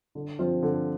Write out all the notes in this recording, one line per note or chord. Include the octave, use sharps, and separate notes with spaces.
D3
F3 C4 F4
D3